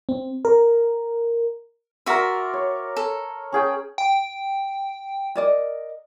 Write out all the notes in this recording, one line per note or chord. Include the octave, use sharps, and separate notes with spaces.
C4
A#4
F#4 A#4 D5 E5 C6
C#5
A4
C#4 G#4 G5
G5
A#4 D5 D#5